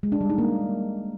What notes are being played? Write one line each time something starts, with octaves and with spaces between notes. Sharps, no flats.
G#3
D4
G3
D#4
A#3